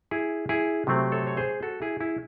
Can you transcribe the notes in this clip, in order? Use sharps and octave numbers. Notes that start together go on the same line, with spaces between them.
E4 G#4
E4 G#4
C3 F#3 A3 C4
A4 C#5
C#5
G#4 C5
F#4 A4
E4 G#4
E4 G#4